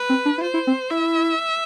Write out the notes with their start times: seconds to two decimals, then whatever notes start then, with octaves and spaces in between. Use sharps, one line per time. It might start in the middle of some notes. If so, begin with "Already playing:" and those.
Already playing: B4
0.09 C4
0.25 D4
0.38 E4
0.42 F4 C5
0.54 E4
0.67 C4
0.91 E4 E5